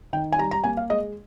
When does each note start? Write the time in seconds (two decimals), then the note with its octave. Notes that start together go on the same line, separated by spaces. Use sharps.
0.13 D#3 G5
0.32 G#5
0.38 G3 A#5
0.51 A#5
0.64 A#3 G#5
0.77 F5
0.90 G#3 D#5